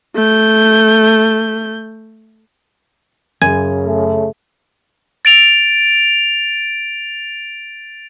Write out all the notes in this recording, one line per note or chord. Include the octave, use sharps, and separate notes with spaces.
A3 G6
F#2 C#3 G#5
A3
A6 D7 F7